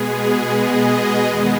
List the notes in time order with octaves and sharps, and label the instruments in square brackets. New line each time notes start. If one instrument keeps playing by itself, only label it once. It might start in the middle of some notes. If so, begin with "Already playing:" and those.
Already playing: [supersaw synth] B2 G#3 B3 G#4
D#5
E2 D#3 G#3 B3